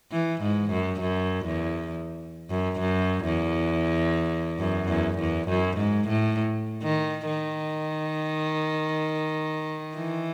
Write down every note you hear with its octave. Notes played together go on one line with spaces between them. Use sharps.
E3
G#2
F#2
F#2
E2
F#2
F#2
E2
F#2
E2
E2
F#2
G#2
A2
D#3
D#3
E3